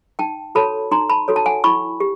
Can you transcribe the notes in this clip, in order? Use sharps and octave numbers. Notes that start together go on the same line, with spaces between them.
D#4 G5 A5
F#4 A4 C#5 A5 B5
D#4 A#5 C6
A5 B5
F#4 A4 C#5
A5
F#5 G#5
E4 B5 C#6
G4